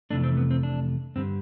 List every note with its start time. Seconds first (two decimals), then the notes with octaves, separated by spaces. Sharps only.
0.10 F2 C3 E3 A3 D4
0.24 C4
0.37 B3
0.51 C4
0.63 D4
1.16 G2 D3 G3 C4